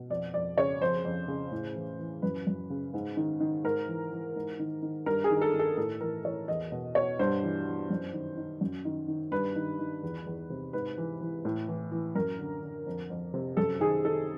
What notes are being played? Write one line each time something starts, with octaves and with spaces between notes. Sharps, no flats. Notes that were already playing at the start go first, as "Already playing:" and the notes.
Already playing: B2
F2 D5
F2 D5
C#3 C#5
F2 C5
F2
C#3
A2
E3
E3
F#2 B4
F#2
C#3
G#2
D#3
D#3
G#2 A#4
E3
E3
G#2
D#3
D#3
G2 A#4
G#4
D#3
A4
D#3
A4
A2 A4
E3 A#4
E3 C#5
E2 D#5
B2
B2 C#5
G2 C5
E3
E3
F#2
D#3
D#3
F#2
D#3
D#3
G2 B4
D#3
D#3
E2
E2
C3
G#2 B4
E3
E3
A2
E3
E3
F#2 A#4
D3
D3
F2
F2
C3
F#2 A4
D#3 G#4
D#3 A4